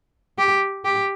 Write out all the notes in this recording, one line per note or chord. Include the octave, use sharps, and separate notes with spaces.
G4
G4